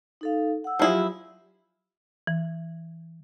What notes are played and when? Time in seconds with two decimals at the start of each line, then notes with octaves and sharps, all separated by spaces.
0.21 D#4 A4 F5
0.64 F#5 E6
0.79 F3 F#3 E4 F4 G4 G#4
2.27 E3